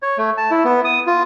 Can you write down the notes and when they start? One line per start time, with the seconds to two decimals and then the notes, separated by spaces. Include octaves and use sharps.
0.02 C#5
0.18 A3
0.38 A5
0.51 E4
0.65 B3
0.85 D#6
1.07 F4